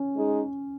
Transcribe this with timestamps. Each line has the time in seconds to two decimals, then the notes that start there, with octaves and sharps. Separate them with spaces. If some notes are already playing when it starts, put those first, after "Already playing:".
Already playing: C#4
0.15 G#3 D#4 G#4